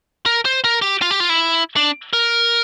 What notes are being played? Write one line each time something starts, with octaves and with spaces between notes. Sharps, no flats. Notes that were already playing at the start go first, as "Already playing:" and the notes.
A#4
C5
A#4
G4
F4
G4
F4
E4
D4
A#4